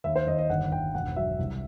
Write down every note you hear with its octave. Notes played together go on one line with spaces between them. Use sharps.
D#2 E5
C5
D#2 D#5
D#5
G1 F#5
G1 G5
E1 F#5
F#3 E5
C2